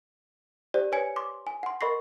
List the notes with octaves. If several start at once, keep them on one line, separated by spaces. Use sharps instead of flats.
G4 C5 D5
B4 C#5 G#5 G#6 C#7
C6 D6
G#5
F#5 C6
A#4 D#5 B5 C#6 A#6 C7